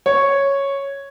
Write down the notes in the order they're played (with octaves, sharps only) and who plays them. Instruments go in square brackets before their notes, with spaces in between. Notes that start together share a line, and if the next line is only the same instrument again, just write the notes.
[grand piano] C#5